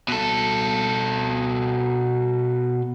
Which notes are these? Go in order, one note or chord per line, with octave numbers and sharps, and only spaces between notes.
B2 A4